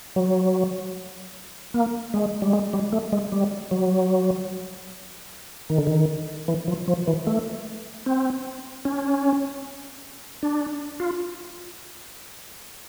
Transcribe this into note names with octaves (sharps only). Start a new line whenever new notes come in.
F#3
A#3
G#3
G3
G#3
G3
A3
G#3
G3
F#3
D#3
D3
D#3
E3
F3
F3
E3
A3
C4
C#4
D4
F4